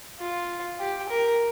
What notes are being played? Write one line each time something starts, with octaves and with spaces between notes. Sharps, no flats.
F4
G4
A#4